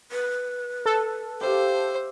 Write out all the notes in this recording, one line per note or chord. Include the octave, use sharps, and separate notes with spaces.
B4
A4
G4 C5 E5 F5